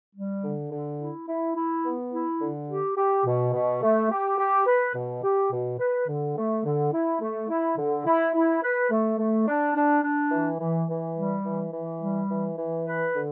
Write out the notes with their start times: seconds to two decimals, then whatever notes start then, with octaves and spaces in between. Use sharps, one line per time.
0.14 G3
0.42 D3
0.71 D3
0.99 E4
1.28 E4
1.55 E4
1.84 B3
2.12 E4
2.40 D3
2.69 G4
2.97 G4
3.25 B2
3.53 B2
3.82 A3
4.10 G4
4.38 G4
4.67 B4
4.95 B2
5.23 G4
5.51 B2
5.79 B4
6.08 D3
6.36 A3
6.64 D3
6.92 E4
7.21 A3
7.49 E4
7.77 D3
8.06 E4
8.34 E4
8.62 B4
8.90 A3
9.18 A3
9.47 D4
9.75 D4
10.03 D4
10.31 E3
10.60 E3
10.88 E3
11.16 G3
11.44 E3
11.73 E3
12.01 G3
12.29 E3
12.57 E3
12.86 B4
13.14 D3